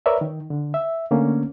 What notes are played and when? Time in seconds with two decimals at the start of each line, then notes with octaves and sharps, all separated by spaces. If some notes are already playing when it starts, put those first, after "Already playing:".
0.06 A#4 B4 C#5 D5 E5
0.21 D#3
0.50 D3
0.74 E5
1.11 D3 A3 A#3 C#4